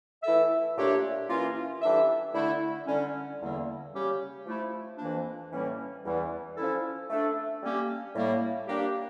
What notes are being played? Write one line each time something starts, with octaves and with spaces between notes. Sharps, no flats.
E3 A3 E4 A4 E5
A#2 A3 D4 G4 C#5
E3 A#3 C#4 F4
E3 G3 D4 A4 E5
D3 A3 E4
D3 G3 C#4
E2 D3 G3 A#3
C#3 G3 C#4 G4
F3 A3 E4
F2 E3 A#3 D4
A2 E3 G3 A#3 C#4
E2 E3 G3
F3 C#4 E4 A4
A3 D4 A4
G3 A#3 C#4 G4
A2 G3 A#3
G3 A#3 D4 G4